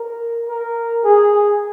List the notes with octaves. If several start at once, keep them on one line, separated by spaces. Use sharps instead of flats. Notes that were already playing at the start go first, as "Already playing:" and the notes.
Already playing: A#4
A#4
G#4